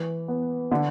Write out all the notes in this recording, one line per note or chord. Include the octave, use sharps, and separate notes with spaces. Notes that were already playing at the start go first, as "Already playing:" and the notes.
Already playing: E3
B3
D3